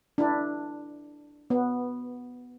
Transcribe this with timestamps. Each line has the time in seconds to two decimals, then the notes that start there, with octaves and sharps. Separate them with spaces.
0.18 D4 E4
1.50 B3